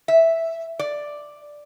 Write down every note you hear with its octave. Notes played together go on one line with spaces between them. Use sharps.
E5
D5